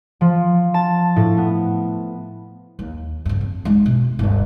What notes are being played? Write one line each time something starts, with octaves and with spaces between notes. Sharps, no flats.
F3
A5
A2
B3
D#2
G2 C#3
F2
G#3 D#4
B2
G1 D2